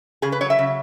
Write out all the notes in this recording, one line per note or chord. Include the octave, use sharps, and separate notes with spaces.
C#3 G#4
B4
F#3 C#5
E5
C#3